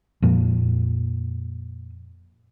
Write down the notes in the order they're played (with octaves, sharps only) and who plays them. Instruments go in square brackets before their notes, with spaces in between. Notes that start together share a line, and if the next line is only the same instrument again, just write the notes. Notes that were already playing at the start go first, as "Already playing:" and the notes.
[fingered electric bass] F2 A#2